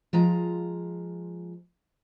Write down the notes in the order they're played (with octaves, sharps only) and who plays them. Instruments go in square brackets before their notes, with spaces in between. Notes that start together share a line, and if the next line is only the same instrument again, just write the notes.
[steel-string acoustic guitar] F3 G#3 F4 A#5